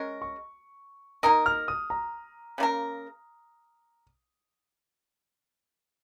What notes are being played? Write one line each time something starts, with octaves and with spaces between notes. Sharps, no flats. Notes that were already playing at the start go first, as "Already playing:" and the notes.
Already playing: G#3 C#4 A#4
C#6
A#3 D#4 A#4 D#6
F6
D#6
A#5
C#3 A#3 F4 A#4